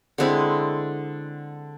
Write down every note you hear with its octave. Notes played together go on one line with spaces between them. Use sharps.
D3 G#3 C4 E4